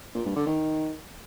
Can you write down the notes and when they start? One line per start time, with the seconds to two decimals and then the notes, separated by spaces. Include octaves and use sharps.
0.15 A#2
0.25 G2
0.36 D3
0.47 D#3